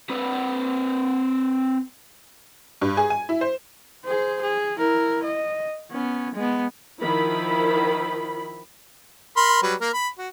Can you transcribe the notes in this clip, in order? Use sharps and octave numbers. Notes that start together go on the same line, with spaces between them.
C4 B4
G2
G#4
G#5
E4
C5
G#4 C5
G#4
E4 A#4
D#5
B3 C#4
G#3 B3
D#3 F3 E4 B5
A#4 B5 C6
F#3 G3 B4
A#3 A#4
B5
F#4